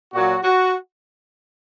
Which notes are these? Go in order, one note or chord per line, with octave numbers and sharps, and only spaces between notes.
A#2 F#3 F#4
F#4